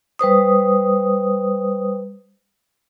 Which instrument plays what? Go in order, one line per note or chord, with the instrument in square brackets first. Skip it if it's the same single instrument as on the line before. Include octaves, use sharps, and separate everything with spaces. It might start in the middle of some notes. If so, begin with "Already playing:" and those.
[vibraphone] G3 B4 C5 D#6